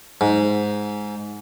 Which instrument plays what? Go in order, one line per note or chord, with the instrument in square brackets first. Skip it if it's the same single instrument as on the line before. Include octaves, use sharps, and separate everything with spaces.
[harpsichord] G#2